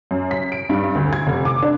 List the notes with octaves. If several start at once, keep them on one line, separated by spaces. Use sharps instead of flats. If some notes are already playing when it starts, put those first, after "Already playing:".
F#2
B6
D7
G2
D2
G#6
F1
D6
D4